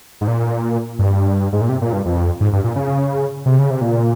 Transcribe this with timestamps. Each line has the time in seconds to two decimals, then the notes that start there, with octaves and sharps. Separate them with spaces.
0.21 G#2
0.28 A#2
0.99 G2
1.52 G#2
1.61 A#2
1.69 C3
1.82 A#2
1.93 G2
2.06 F2
2.40 G#2
2.53 G2
2.64 A#2
2.76 C#3
3.46 C3
3.59 C#3
3.70 C3
3.81 A#2